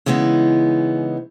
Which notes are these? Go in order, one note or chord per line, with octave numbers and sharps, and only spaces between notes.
C#3 E3 G#3 B3 D#4